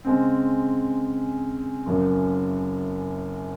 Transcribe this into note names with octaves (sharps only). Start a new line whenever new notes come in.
C#3 G#3 C4
F#1 F#2 C#3